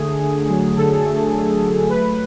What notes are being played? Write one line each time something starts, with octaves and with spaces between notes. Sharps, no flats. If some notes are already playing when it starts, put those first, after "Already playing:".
Already playing: D3 A3 G#4
D3
F#3
D3 A4
A3
D3
F#3
A3 B4